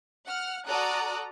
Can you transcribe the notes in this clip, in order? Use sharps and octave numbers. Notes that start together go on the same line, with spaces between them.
F#5 F6
F#4 A4 D5 A#5 D#6 F#6